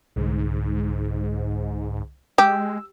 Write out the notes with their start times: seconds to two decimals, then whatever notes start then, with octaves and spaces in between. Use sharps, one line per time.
0.16 C2 G#2 D3
2.38 G#3 G4 E6